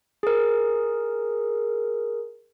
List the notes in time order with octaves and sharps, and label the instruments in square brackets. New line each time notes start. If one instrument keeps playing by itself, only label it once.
[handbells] G#4 A#4